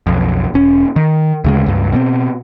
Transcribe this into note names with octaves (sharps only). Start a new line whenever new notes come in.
B1 F2
E1 C#4
D#3
D2 C#3 G#3
C#2 G2
B2 F#3 C4